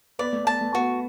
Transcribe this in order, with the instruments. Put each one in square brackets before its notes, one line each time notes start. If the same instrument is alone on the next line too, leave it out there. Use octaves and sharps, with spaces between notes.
[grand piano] B3 B4 [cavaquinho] D5
[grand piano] A3
[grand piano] B3 [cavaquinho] A5
[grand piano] A3
[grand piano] B3 [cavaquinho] F#4